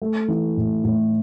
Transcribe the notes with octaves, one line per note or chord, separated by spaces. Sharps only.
A3
E3
A2
A2